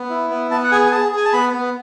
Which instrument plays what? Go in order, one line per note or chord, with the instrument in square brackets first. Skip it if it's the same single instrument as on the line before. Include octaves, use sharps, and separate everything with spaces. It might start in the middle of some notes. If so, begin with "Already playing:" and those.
Already playing: [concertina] B3
E4
B3
B3 A5
F#5
G#4 G#5
G#5
G#4 A5
G#4
G#5
A5
B3 B5
B3